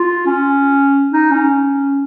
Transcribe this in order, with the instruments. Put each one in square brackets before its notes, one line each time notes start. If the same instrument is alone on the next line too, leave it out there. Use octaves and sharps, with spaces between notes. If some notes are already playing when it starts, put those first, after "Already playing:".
Already playing: [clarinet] F4
C#4
D#4
C#4